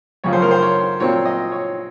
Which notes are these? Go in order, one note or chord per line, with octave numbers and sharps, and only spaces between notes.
F#2 C#3 F3 A3 C#5
C5
A#4
C5
C#5
A#2 F#3 C4 C#5
D#5
C#5